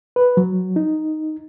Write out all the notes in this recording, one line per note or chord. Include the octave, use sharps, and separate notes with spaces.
B4
F#3
D#4